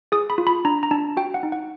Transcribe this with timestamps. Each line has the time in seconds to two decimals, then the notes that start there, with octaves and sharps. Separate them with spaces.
0.12 G#4 D#6
0.30 B5
0.38 F4
0.47 B5
0.65 D4 A#5
0.83 A#5
0.91 D4 A5
1.17 F#4 G5
1.34 F#5
1.43 D#4
1.52 F#5